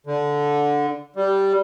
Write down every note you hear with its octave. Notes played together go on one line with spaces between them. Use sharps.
D3
G3